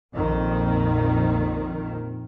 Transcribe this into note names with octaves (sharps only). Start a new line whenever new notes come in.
A#1 F2 D#3